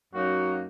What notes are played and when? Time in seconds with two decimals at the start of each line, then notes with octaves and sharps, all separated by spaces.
0.12 F#2 F#3 A#3 D#4 F#4